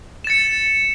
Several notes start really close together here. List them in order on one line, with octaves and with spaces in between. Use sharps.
E7 A6 C#7